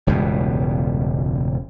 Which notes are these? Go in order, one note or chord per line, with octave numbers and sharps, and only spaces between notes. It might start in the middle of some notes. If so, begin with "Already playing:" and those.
E1 C#2 G2 B2